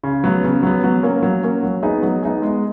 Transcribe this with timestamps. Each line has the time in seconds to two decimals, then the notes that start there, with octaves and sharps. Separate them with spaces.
0.03 C#3
0.24 F#3 B3
0.44 C#3
0.63 F#3 B3
0.84 F#3
1.03 A#3 C#4
1.23 F#3
1.44 A#3 C#4
1.63 F#3
1.83 B3 D#4 G#4
2.02 F#3
2.23 B3 D#4 G#4
2.42 G#3